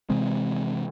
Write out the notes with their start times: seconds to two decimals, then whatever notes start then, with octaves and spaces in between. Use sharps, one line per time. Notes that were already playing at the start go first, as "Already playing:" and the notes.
0.10 C3 E3 G#3 C4